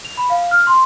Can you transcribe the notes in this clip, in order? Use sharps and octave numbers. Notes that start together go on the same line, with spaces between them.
F7
B5
F5
F6
C6